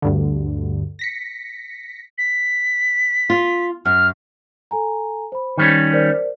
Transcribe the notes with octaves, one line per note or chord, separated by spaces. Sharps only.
D2 G2 D3
A#6 B6 C#7
B6
F4
F#2 F6
A4 G#5 A#5
C5 B5
D#3 G3 C#4
A#4 C5 D5